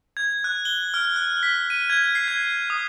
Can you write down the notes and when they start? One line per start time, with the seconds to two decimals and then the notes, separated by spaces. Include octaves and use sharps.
0.17 G#6
0.44 F#6
0.65 G7
0.94 F6
1.16 F#6
1.43 B6
1.70 D#7
1.90 G#6
2.15 C7
2.28 G#6
2.70 D#6